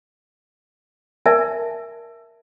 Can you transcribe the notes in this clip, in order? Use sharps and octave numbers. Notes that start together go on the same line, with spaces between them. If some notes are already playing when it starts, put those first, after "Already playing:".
A#4 D5 E5 G#5 A5